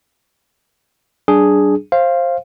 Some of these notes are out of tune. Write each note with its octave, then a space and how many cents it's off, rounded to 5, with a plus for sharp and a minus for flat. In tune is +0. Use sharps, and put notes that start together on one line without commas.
G3 -35 D4 +0 G#4 +0
C5 +20 F5 -10